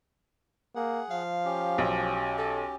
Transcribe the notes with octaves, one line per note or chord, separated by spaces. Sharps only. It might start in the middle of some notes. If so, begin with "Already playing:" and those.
A#3 G#4 F#5
F3 F5
C#4 G4
B1
A4